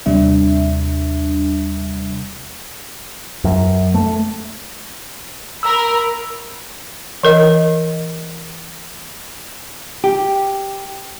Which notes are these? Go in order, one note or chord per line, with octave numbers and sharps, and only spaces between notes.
D#2 C3 G3 D4 E5
F#2
A3
A#4 B5 E6
E3 A#4 D#5
G4